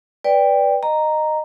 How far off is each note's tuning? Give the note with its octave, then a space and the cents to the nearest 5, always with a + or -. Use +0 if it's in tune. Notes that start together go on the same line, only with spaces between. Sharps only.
B4 +0 D5 -10 G5 +15
D#5 -20 A#5 +0